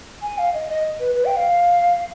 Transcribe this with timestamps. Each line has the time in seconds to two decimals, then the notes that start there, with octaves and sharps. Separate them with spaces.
0.22 G#5
0.38 F5
0.54 D#5
0.69 D#5
1.00 B4
1.15 B4
1.25 G5
1.36 F5